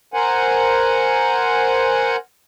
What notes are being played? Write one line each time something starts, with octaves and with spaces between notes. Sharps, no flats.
A#4 C5 F#5 G#5